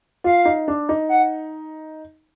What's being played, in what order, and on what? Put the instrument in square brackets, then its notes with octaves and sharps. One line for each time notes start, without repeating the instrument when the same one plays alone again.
[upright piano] F4 [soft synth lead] F5
[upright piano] D#4
D4
D#4
[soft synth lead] F#5